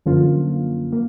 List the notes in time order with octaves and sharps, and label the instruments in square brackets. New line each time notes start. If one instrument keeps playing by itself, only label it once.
[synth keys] F#2 D3 F3 A#3 F4
A#3